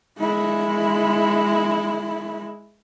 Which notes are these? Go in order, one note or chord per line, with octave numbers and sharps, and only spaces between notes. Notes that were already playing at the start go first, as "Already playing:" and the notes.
G#3 E4